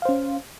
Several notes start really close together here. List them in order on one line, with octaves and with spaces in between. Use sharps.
F5 C5 C#4